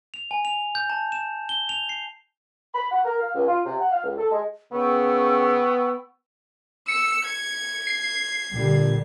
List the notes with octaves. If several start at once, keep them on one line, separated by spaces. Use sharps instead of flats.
F7
G#5
F7
G6
A5
E7
G7
F7
C7
B5
F#5
A#4
F5
C#2
F4
C3
F#5
F5
C#2
A4
G#3
C#3 B3 G5 C#6 E6
E6 C#7
G#6
C7
A#2 D3 G3